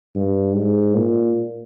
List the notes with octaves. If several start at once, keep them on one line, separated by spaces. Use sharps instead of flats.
G2
G#2
A#2